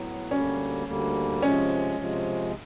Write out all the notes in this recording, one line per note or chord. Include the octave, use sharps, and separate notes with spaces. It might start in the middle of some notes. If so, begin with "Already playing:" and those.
Already playing: A2 F#3 B3
D2 D3 G3 A#3 C#4
D2 D3 G3 A#3
C3 F3 G#3 C#4
C3 F3 G#3